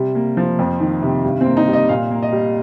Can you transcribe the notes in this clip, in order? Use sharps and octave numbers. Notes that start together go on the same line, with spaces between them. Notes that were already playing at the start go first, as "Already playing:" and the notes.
Already playing: C3 G3
A#3
F3
F2
D#3
C3
G2
C4
A#3
D#4
G3
D#5
A#2 F5
A#3
D#5
G3